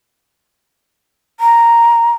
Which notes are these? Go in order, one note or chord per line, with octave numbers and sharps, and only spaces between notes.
A#5